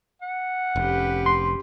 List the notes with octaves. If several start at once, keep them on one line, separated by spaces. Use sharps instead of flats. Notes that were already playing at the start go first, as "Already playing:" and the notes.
F#5
F1 C#4 G4 B4
C6